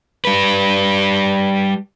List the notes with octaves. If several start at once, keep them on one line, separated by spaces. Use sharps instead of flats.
G3 B4